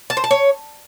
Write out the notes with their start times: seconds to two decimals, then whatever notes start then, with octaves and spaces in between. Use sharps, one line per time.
0.10 A5
0.17 C5
0.24 A5
0.31 C#5